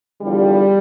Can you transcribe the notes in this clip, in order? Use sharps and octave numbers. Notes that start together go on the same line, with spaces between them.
E2 D3 F3 G3